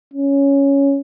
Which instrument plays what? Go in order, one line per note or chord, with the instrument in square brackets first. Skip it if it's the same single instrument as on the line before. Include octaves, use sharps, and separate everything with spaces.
[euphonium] C#4